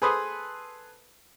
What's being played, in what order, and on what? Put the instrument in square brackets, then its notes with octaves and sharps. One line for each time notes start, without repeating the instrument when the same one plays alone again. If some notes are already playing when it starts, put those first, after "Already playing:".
[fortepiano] G#4 A4 B4 C5 B5 D#6